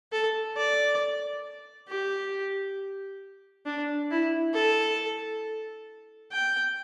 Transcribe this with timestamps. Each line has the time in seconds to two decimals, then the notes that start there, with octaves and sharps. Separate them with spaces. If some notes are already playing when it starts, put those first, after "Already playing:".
0.12 A4
0.57 D5
1.88 G4
3.66 D4
4.11 E4
4.54 A4
6.32 G5